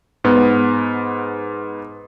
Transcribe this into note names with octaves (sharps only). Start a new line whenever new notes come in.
G#2 B3